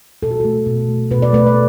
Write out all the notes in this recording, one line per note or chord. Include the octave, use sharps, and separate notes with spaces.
B2 A4
F#4
A3 A4
B2
A3
B2 B4
D5
A3 B4
D5